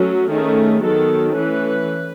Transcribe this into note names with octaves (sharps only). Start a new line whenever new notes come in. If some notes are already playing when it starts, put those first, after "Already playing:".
Already playing: F#3 A3 C#4
D#3 A3 C#4 G#4
D#3 F#3 B3 A4
E3 A3 C#4 B4